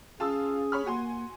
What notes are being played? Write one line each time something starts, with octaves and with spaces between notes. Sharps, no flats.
C#4 F4 G#4 A5 E6
C#5 B5 F6
A#3 F#4 G#5 C6